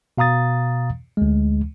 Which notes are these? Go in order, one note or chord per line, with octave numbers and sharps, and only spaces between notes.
B2 F5 A#5 D#6 A6
D2 G#3